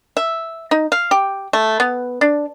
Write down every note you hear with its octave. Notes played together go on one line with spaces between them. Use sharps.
E5
D#4
F5
G4
A3
B3
D4